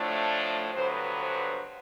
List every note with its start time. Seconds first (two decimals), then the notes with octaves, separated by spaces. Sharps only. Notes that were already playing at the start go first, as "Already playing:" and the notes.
Already playing: A2 F3 A3 D4
0.74 G2 D3 F#3 B3 C5
1.19 C5